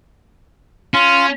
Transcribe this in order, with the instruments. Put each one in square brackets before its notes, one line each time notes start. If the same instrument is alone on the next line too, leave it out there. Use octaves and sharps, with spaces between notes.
[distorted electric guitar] C#4 [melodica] F4 F5